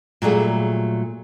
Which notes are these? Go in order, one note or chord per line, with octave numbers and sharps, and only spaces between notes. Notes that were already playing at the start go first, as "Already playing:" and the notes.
A#2 F#3 G3 A3 G#4